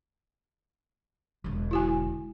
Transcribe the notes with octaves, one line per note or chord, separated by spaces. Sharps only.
E1 D3
E4 F#4 G#5